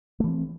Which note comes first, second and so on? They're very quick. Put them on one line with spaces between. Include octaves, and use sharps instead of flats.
A3 E3 C4